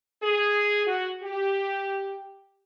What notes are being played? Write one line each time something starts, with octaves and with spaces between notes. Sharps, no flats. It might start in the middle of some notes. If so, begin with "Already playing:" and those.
G#4
F#4
G4